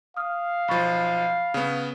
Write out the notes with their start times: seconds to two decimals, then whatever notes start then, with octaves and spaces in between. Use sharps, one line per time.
0.17 F5 D#6 F6
0.68 B1 F3 B5 C#6 A6
1.54 C#3 B3